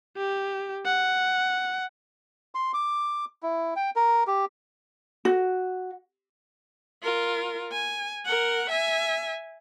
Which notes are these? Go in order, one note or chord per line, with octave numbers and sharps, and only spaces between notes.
G4
F#5
C6
D6
E4
G5
A#4
G4
F#4
F4 A#4
G#5
A#4 F#5
E5 G#5